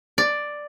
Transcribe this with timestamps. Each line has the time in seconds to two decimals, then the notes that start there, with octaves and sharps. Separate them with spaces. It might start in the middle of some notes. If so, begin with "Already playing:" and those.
0.18 D5